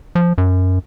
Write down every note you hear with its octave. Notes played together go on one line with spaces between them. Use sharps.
F3
F#2